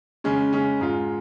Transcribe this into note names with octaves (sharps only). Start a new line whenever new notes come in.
C#3 G#3 C#4
C#3 G#3 C#4
G#2 G#3 F4